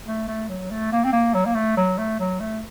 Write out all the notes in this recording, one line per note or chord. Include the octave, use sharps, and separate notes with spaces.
A3
A3
F#3
A3
A#3
C4
A#3
F#3
A#3
A3
F#3
A3
F#3
A3